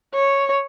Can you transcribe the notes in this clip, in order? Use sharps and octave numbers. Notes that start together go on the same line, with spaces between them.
C#5